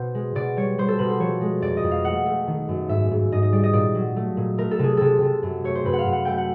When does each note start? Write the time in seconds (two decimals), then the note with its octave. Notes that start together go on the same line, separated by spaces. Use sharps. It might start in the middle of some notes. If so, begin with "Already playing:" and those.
Already playing: B2 C5
0.15 G#3
0.35 B2 D5
0.57 G3 C#5
0.78 G3 C5
0.88 A4
0.99 B2 B4
1.09 C5
1.19 F3 C#5
1.41 G#3
1.62 F2 D5
1.77 D#5
1.84 F2
1.91 F5
2.04 A3 F#5
2.26 A3
2.47 D#3
2.68 F#2
2.89 G#2 E5
3.11 G#2
3.32 G#2 D#5
3.42 D#5
3.52 G3 D5
3.63 D#5
3.73 A#2 D5
3.95 F#3
4.16 A3
4.37 A#2
4.58 A3 A#4
4.71 A4
4.79 C3 G#4
4.97 C3 A4
5.21 C3
5.43 F#2
5.64 A3 C#5
5.75 C5
5.85 F#2 B4
5.93 F#5
5.99 F5
6.06 F#2
6.13 F#5
6.25 A3 G5
6.38 F#5